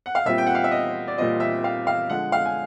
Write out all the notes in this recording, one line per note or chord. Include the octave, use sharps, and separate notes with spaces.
F#5
F5
A#2 G3 C4 F4 E5
G5
F#5
F5
E5
D#5
D5
A#2 G3 C4 F4 D#5
E5
F5
F5
D3 F3 G#3 F#5
F5
G#5